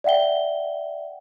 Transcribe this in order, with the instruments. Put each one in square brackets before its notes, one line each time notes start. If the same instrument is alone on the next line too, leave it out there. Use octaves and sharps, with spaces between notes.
[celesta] D5 E5 F#5 G5 G7